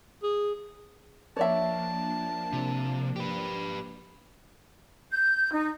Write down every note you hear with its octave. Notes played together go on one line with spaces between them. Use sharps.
G#4
F3 A#3 D4 C#5 D5 E5 A5
C3
G4 B4
G6
D#4